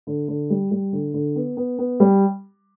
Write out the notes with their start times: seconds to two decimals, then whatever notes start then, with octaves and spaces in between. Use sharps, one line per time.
0.07 D3
0.28 D3
0.50 G3
0.71 G3
0.93 D3
1.14 D3
1.36 B3
1.57 B3
1.79 B3
2.00 G3